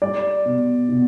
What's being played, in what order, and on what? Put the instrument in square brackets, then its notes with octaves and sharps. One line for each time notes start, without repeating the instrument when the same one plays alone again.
[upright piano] G3 D5
B2
B2